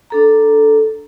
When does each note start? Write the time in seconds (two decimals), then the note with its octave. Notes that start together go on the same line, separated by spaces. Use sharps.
0.10 D4 A4 A#5